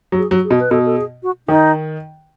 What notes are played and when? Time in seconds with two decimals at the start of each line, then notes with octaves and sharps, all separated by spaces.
0.12 F#3
0.18 G#4
0.31 F#3
0.45 G#4
0.51 B2
0.59 B4
0.71 B2 A4
0.86 A4
0.96 G#4
1.23 F#4
1.48 D#3 D#4